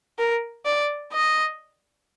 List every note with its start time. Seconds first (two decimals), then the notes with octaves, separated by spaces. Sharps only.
0.19 A#4
0.65 D5
1.13 D#5